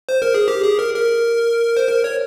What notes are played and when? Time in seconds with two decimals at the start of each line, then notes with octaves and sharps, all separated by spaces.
0.09 C5
0.22 A#4
0.34 G#4
0.48 G4
0.63 G#4
0.79 A#4
0.94 A#4
1.77 C5
1.89 A#4
2.04 C#5